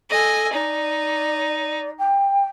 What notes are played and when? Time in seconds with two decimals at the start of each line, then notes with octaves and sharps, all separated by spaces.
0.11 A4 D#5 G#5
0.53 D#4 D5
1.98 G5